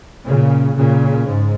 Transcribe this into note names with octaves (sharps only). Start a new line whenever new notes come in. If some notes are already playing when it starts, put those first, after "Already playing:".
A#2 C#3
A#2 C#3
G#2